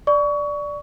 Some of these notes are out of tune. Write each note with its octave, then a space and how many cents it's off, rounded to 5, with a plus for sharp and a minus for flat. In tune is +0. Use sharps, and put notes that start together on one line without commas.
D5 +0 C#6 +25